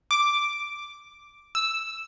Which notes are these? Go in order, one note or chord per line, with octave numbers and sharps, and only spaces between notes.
D6
E6